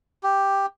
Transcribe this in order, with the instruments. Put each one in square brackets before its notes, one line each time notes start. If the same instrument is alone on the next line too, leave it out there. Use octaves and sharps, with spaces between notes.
[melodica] G4